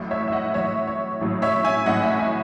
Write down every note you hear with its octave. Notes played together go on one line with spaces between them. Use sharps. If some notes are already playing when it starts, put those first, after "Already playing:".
Already playing: A1 A2 F#3
C#5 E5
E5
D#5 F#5
A1 A2 F#3 C#5 E5
C#5
A1 A2 F#3
C#5 E5
E5 G#5
A1 A2 F#3 D#5 F#5
C#5 E5
E5 G#5